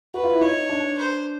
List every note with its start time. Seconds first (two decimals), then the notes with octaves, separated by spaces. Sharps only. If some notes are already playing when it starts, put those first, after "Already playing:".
0.14 F#4 B4
0.23 F4
0.32 E4
0.41 D#4 C#5
0.69 D4
0.98 C5